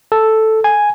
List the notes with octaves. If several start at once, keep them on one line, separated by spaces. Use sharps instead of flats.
A4
G#5